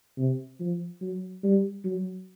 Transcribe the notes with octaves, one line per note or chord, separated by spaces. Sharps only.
C3
F3
F#3
G3
F#3